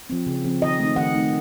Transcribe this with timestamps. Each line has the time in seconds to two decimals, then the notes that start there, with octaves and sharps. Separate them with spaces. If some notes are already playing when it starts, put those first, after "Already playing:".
0.10 F3 C4
0.27 C#3
0.44 F3 C4
0.62 D#3 D#5
0.79 A3 C4 D#4
0.96 D#3 F#5
1.14 A3 C4 D#4